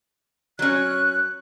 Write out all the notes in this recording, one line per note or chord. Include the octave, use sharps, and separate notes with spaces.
F#3 C#4 F#6